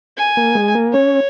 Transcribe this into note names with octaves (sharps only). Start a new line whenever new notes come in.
G#5
A#3
G#3
A#3
C#4 C#5